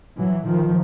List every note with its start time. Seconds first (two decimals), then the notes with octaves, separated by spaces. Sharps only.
0.18 E3 F#3
0.47 D#3 F3